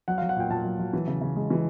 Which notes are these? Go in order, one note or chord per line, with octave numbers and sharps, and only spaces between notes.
F#3 F#5
F5
F#3
F#5
A#2 G5
A#2 A5
F#3
F#3
E3
C#3
C#3
G#3
E3